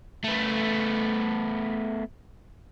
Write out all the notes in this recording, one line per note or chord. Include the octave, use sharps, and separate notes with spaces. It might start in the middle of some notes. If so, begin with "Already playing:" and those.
A3 B3